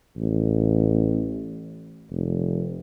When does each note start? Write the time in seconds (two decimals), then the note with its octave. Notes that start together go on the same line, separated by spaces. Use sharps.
0.17 A1
2.11 F1